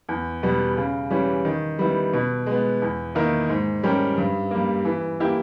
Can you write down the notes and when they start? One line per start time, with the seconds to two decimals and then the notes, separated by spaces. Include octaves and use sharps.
0.09 E2
0.43 B2 G3 B3
0.77 C#3
1.10 E3 G3 C#4
1.45 D#3
1.79 G3 B3 E4
2.13 B2
2.46 G#3 B3
2.82 E2
3.15 D#3 A#3 E4 A#4
3.49 G#2
3.83 G3 C#4 G4 A#4
4.17 G2
4.51 G3 A#3
4.85 E3
5.20 A#3 E4 G4